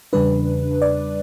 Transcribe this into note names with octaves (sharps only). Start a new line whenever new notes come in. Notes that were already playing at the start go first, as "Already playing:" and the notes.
E2 C#3 G3 D4 B4
D5